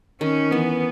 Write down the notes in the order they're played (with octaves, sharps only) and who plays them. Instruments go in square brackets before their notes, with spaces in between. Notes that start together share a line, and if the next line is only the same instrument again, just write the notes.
[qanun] D#3 [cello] C#4
[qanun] E3 [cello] B3